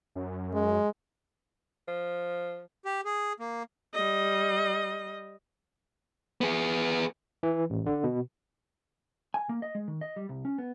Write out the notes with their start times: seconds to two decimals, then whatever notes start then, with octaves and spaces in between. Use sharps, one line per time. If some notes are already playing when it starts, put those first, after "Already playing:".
0.15 F#2
0.54 G#3
1.88 F3
2.85 G4
3.05 G#4
3.40 A#3
3.94 G3 D#5
6.41 B3 G#4
7.43 E3
7.70 A1
7.86 D3
8.04 B2
9.34 G#5
9.49 A#3
9.62 D#5
9.75 G#3
9.88 D#3
10.01 D#5
10.16 G3
10.29 C2
10.45 C#4
10.58 B3